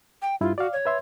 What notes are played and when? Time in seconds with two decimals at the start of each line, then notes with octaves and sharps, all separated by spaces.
0.22 G5
0.41 G2 E4 F4
0.58 F#4 D5 F5
0.73 C#5
0.86 B4 E5 C6